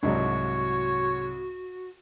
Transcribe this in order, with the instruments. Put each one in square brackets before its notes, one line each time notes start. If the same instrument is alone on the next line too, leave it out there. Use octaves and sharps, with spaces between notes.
[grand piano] C2 G#2 F#3 [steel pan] D4 D#4 [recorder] F#4 [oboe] C#5